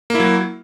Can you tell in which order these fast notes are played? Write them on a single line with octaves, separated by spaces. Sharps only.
A#3 E4 F#3